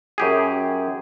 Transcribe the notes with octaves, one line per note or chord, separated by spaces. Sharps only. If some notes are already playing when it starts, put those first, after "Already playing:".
F#2 G4 G#4